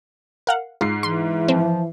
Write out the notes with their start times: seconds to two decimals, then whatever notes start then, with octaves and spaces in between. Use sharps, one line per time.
0.47 A#4 F5 F#5
0.81 G#2 F4 C7
1.03 E3 C6
1.48 F3 C4